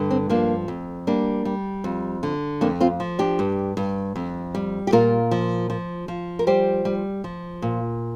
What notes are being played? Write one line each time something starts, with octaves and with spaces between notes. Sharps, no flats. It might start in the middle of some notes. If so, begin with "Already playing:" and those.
Already playing: G2 D3
C4
F3 A#3 D4
F2
G3 A#3 D4
G3
F2
D3
F2 A#3 D4
C4 F4
F3
D4 G4
G2
G2
F2
G3
G4
A#2 F4 A#4
F3
F3
F3
A#4
G3 G4 C5
G3
F3
A#2